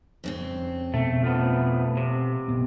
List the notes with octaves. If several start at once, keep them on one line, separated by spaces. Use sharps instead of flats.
F2 C#3 C4
B2 A3 C#4
F3 A3 B3
C3
F#1 B2 B3